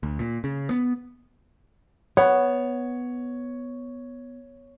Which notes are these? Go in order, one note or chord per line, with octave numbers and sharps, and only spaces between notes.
D2
A#2
C#3
B3
B3 C#5